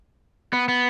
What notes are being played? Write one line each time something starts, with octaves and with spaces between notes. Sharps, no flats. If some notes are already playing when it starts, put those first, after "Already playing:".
B3
B3